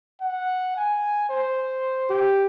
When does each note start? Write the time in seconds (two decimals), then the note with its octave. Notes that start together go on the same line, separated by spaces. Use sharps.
0.22 F#5
0.77 G#5
1.30 C5
2.10 G4